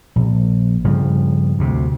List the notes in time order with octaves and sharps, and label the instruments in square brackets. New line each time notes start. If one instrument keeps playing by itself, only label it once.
[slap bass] A#1
G2 C#3 F3
D2 C3